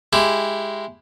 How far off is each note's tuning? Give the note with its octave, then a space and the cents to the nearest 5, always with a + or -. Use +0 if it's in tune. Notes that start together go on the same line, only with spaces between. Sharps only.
G#3 +0 E4 +0 G4 +0